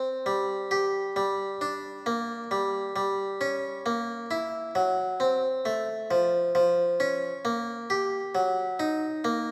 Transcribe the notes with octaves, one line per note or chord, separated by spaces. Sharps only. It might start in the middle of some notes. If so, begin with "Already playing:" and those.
Already playing: C4
G3
G4
G3
D4
A#3
G3
G3
C#4
A#3
E4
F#3
C4
A3
F3
F3
C#4
A#3
G4
F#3
D#4
A#3